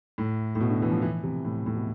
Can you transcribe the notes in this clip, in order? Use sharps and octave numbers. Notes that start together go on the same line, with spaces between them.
A2
A2
B2
D3
E3
F3
E3
C3
A2
A2
B2